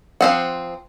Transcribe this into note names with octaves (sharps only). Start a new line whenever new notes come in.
F3 C4 F#5